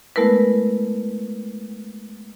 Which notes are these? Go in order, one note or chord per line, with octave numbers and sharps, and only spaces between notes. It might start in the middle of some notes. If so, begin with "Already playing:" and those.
G#3 A3 B3 E4 A#4 B4